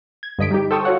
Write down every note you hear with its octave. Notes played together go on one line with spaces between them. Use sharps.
G#6
G2 D3 D#5 B6 D7
G3 D#4 G4
A4 C5 G5 C#6 D#6 E6
F4 F#4 C#5 F#5